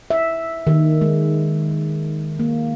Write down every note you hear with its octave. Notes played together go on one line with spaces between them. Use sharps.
E5
D#3
G#3
A#3